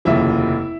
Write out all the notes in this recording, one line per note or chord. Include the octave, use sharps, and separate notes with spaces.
F1 D#2 C#3 F3 E4 E5